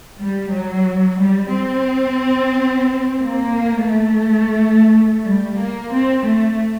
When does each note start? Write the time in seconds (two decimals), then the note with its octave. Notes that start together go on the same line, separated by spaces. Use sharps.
0.20 G3
0.53 F#3
1.21 G3
1.54 C4
3.22 A#3
3.90 A3
5.24 G3
5.58 A#3
5.91 C4
6.25 A3